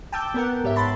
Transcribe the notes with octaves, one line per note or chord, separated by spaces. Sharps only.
G5 A5 D6 E6 G6
B3 A#4 F#5
G#2 G4 C#5 E5
A5 B5 C6 A6